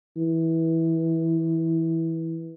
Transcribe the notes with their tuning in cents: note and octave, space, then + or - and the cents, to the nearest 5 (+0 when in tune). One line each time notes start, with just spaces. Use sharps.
E3 -15